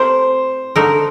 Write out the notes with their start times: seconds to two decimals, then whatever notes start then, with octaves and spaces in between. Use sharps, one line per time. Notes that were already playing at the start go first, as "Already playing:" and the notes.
Already playing: A3 C4 G4 A#4 C5
0.76 D3 A3 D#4 A#4